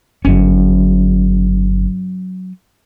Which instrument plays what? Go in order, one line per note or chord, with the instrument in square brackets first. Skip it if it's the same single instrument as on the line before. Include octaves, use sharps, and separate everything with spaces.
[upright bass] G1 [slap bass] F#3 C#4